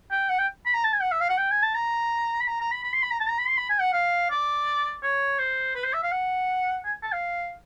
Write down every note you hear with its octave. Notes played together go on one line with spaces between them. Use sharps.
G5
F#5
G5
B5
A#5
A5
G#5
F#5
E5
F5
F#5
G5
G#5
A5
A#5
B5
A#5
A#5
B5
B5
C6
B5
A#5
A5
A#5
B5
C6
B5
G#5
F#5
F5
D5
C#5
C5
B4
C5
E5
F5
F#5
G#5
A5
F5